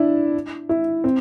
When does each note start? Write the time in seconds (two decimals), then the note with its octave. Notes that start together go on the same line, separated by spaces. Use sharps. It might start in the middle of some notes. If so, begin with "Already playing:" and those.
Already playing: D4 E4
0.69 E4
1.04 C4